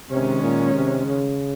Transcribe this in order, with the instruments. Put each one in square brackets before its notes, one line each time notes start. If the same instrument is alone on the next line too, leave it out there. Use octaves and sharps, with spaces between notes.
[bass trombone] C3 [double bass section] D#3 G#3 C#4
[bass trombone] A#2
C3
C#3